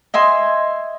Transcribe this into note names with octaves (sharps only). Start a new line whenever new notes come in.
D#5 E5 G#5 C6